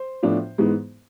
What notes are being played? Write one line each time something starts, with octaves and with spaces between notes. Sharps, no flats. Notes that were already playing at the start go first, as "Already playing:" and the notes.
Already playing: C5
A2 F3 B3 D4
G#2 E3 G#3 B3